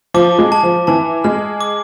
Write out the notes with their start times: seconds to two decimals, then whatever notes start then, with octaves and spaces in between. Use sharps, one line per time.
0.14 F3 D6
0.39 G#3
0.52 A5
0.63 F3
0.87 E3 A5
1.24 G#3 F6
1.61 D6